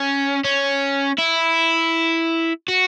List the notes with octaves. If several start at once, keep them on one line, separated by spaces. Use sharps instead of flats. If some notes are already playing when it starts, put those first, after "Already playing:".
Already playing: C#4
C#4
E4
F#4